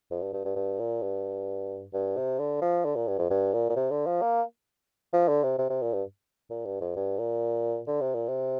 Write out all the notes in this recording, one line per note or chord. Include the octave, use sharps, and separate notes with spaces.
F2
G2
G2
G2
G2
A#2
G2
G2
C3
D3
F3
D3
A#2
G2
F2
G2
A#2
A#2
C3
D3
F3
A#3
F3
D3
C3
C3
C3
A#2
G2
A#2
G2
F2
G2
A#2
D3
C3
A#2
C3